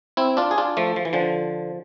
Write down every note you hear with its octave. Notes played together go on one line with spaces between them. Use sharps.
C4 E4
D4 F4
G#4
D4 F4
F3 A3
F3
E3
D3 F3